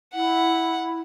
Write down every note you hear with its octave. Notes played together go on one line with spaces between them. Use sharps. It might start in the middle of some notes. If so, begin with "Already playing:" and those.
E4 F#5